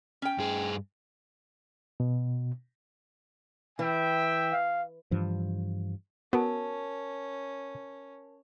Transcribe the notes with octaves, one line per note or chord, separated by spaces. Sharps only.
C#4 G5
G2 G#4
B2
E3 E5 G5
F5
G2 E3 F3
B3 C#4 F#4 A#4 A5